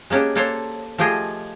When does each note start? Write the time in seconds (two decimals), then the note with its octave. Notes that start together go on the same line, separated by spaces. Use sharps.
0.10 G#3 A#3 C#4 D4 G4
0.35 A#3 D4 A4 C5 C#5
0.98 F3 A3 F4 G4 G#4 D#5